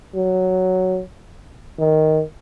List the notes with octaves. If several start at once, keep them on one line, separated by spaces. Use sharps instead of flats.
F#3
D#3